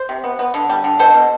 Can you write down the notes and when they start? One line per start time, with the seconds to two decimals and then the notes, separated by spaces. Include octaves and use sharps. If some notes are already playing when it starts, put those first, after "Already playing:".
Already playing: C5
0.09 C3
0.24 B3
0.39 B3
0.54 D3
0.70 G3
0.84 D3
0.99 B2 A4 C5
1.14 B2